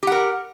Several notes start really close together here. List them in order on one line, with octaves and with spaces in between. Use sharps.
G4 F#5 A#4